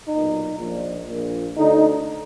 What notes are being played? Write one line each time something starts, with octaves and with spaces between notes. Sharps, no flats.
B1 A#2 D#4
A#1 A#2
A#1 A#2
D2 D3 D#4